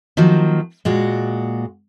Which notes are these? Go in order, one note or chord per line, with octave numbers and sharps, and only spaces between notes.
D#3 F3 F#3 A#3
A#2 G#3 F#4